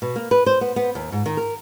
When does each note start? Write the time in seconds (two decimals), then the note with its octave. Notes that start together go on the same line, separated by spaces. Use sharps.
0.02 B2
0.16 A#3
0.31 B4
0.46 C5
0.61 B3
0.76 B3
0.95 D#2
1.12 G#2
1.26 D#3
1.37 A#4